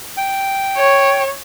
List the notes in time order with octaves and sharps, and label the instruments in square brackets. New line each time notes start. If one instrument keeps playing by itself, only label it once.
[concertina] G5
[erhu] C#5